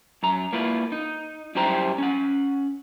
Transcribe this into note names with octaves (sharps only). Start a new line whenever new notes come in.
F#2 A#5
A#3 E4 F4 B4
D#4
F#2 G3 E4 G4 C5 A#5
C#4 F#5